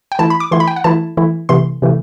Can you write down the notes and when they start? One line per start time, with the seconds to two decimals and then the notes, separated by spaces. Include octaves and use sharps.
0.12 G5
0.19 E3 A3 E4 A5
0.30 B5
0.40 D6
0.51 E3 A3 E4 C6
0.60 B5
0.67 G5
0.76 F#5
0.84 E3 A3 E4 A5
1.17 E3 A3 E4
1.49 C3 E3 A3 C6
1.82 C3 E3 A3